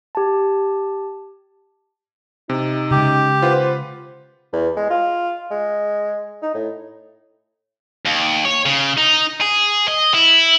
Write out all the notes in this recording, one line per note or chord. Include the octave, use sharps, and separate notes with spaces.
G4 A5
C3 D#4
C#3 G#3 G4
F4 B4 C5 F#5
E2
G#3
F4
G#3
D#4
A2
D#2
C#5
C#3
D#4
G#4
D#5
E4